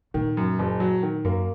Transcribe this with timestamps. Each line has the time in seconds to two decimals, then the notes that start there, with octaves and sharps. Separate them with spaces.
0.14 A#2 D#3
0.37 F#2
0.59 F#1
0.80 F#3
1.03 D#3
1.24 F#2 A#3